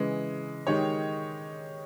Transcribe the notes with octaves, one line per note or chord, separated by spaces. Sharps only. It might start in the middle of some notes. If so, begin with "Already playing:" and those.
Already playing: C#3 E3 G#3
D#3 G#3 D#4 G4 C#5